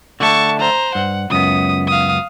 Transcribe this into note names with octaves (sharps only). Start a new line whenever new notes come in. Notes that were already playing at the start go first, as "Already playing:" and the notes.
D3 A3 A5 C#6
C5 A#5
G2 F#5
C#2 F#2 B3 D#6
F5 D#6